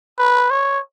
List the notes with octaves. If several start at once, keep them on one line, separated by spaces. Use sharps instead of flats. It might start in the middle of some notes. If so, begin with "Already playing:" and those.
B4
C#5